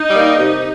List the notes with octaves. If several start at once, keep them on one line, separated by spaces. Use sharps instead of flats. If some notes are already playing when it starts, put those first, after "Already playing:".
Already playing: D#4
G3 A#3
C3